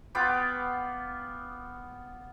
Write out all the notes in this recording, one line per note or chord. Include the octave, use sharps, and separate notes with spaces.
B3 F4 G5 D6